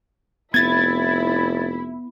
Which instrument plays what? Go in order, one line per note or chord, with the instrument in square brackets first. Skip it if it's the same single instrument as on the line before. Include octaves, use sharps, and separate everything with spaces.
[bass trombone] F1 [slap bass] B3 [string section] E4 [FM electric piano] G#6 A6